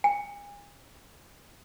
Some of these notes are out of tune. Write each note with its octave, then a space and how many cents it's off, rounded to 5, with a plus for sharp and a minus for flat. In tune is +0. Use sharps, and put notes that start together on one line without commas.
G#5 -35